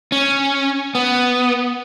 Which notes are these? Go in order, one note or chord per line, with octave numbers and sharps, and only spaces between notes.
C#4
B3